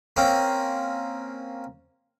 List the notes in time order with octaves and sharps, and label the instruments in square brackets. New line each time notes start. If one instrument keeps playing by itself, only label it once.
[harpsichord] A#3 C4 C#4